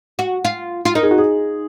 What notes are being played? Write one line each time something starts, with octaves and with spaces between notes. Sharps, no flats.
F#4
F4
F4
D#4 A#4
G#4
F#4
G#4